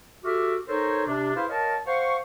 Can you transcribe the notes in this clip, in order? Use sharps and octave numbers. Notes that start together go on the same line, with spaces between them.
F#4 G4 A4 E5 D6 F6
D#4 A4 A#4 C5 C#5
C3 D4
E4 G#4 B4 C5 F5
A#4 C#5 D#5 F5 A5
C5 F5 F#5 C#6